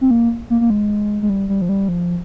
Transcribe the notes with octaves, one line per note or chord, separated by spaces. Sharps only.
C4
A#3
A#3
A#3
G#3
G#3
G3
G3
F3
G3
F3